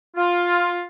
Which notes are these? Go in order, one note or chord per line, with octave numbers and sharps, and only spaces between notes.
F4